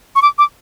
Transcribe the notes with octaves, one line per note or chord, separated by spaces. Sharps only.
C#6
D6
D6